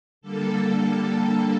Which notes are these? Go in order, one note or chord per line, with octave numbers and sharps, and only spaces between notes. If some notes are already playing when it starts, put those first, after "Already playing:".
D3 G3 A#3 A4